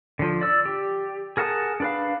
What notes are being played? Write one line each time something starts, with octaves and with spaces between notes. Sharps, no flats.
D3 F3
D5 E6
G4
G#4 A#4 F#5 A5 D#6
D4 B4 F5